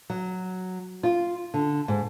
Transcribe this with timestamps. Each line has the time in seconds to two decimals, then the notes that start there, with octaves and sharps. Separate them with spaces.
0.10 F#3
1.03 F4
1.54 D3
1.88 G#2